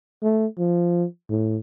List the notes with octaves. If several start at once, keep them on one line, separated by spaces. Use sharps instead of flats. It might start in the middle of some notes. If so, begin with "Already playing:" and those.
A3
F3
A2